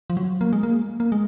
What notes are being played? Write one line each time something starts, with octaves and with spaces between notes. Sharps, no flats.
F3
F#3
A#3
G#3
A#3
A#3
G#3